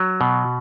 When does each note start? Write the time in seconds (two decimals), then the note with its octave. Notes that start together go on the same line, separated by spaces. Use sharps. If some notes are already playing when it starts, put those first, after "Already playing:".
Already playing: F#3
0.21 B2